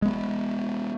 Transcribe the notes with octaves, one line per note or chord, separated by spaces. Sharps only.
G#3 B3